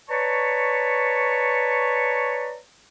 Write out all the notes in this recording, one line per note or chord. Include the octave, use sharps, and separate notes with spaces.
B4 C#5 D5 A5 A#5 C#6